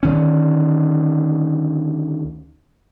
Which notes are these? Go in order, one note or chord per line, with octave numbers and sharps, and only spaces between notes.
D2 D#3 C#4